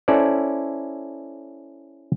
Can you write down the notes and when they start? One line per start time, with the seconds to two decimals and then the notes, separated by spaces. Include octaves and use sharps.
0.08 C#4 E4 A4 C5 D5